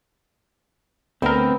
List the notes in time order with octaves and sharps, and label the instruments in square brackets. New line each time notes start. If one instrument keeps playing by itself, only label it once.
[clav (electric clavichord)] D2 A#4 [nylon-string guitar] A3 B3 [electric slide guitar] C4